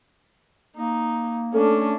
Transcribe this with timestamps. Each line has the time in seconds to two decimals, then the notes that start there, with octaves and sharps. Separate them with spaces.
0.77 A#3 D#4
1.54 A3 C#4 D4 A4